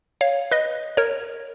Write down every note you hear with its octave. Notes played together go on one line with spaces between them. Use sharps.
C#5 F5
B4 D#5
A#4 C#5